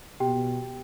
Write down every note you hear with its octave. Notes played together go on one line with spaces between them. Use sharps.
B2 G4 G5